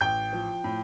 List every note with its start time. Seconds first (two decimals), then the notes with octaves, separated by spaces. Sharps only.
0.01 A1 G5 G6
0.33 F3
0.64 A2